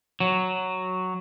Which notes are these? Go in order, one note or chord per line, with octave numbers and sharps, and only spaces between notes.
F#3